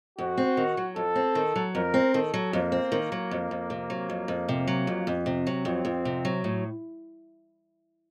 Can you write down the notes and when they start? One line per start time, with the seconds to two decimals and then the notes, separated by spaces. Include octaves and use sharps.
0.19 F2 F#4
0.38 C4
0.57 D#3
0.77 F#3
0.96 F2 A4
1.16 C4
1.35 D#3
1.56 F#3
1.75 F2 A#4
1.94 C4
2.14 D#3 A4
2.34 F#3
2.53 F2 A#3
2.72 C4
2.92 D#3
3.12 F#3
3.31 F2
3.51 F2
3.70 C3
3.90 F#3
4.10 F2
4.28 F2
4.49 C3
4.68 F#3
4.87 F2
5.07 F2
5.26 C3
5.47 F#3
5.65 F2 C4
5.85 F2
6.05 C3
6.25 F#3
6.44 A2